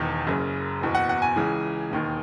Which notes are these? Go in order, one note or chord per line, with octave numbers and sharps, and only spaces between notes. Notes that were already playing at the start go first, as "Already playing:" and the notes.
Already playing: E1 E2 D#3
F#1 F#2 C#3
F#1 E2 B2
F#5
F#5
G#5
C#2 C#3 E3
E1 D#2 D#3